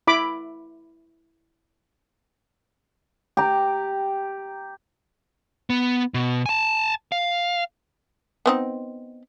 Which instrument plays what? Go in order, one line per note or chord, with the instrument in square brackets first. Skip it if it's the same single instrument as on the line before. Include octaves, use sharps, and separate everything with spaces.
[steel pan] E4 B5 D6
[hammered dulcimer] G4 A#5
[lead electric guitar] B3
B2
G#5 A5
F5
[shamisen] B3 C4 D#4